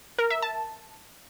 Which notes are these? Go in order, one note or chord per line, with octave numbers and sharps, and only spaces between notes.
A#4
E5
A5